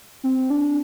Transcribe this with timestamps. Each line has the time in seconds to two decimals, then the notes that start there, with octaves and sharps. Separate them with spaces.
0.24 C4
0.50 D4